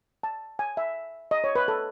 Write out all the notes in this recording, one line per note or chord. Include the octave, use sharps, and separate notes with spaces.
A5
G#5
E5
D#5
C#5
B4
A4